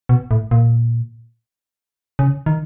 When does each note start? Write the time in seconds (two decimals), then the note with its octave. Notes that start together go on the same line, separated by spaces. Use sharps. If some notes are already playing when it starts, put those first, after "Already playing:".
0.09 B2
0.31 A2
0.51 A#2
2.19 C#3
2.46 D#3